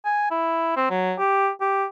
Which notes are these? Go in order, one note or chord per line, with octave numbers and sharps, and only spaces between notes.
G#5
E4
C4
F#3
G4
G4